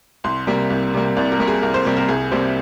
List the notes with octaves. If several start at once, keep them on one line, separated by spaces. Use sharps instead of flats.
C2 C6
C3 G3 A#3
C2
C3 G3 A#3
C2 D5
A#4
C3 G3 A#3
G#4
C2 A#4
C5
C3 G3 A#3
A#4
C2 G#4
C3 G3 A#3 C5